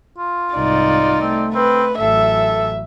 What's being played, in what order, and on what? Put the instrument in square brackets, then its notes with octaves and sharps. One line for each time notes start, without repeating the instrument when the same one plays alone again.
[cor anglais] F4
[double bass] C2 G#2 [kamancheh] D#4 D5
[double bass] A3 [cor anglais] C4
[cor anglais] C4 [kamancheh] B4
[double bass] A1 F#3 [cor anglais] A4 [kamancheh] E5